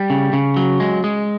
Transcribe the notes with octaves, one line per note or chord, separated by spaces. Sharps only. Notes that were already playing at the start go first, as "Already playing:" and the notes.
Already playing: G3
C#3
C#3
F#3
G#3
G#3